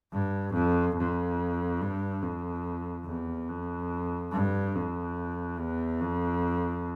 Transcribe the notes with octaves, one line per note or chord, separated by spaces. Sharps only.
G2
F2
F2
G2
F2
E2
F2
G2
F2
E2
F2